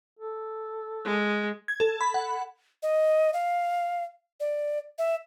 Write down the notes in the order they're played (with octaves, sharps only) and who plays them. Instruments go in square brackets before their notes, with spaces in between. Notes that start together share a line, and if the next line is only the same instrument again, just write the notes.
[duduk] A4
[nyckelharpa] G#3
[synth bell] G#6
A4
B5
F#5
[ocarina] D#5
F5
D5
E5